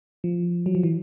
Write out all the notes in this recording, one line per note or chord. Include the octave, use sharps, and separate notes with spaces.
F3
F#3
F3
E3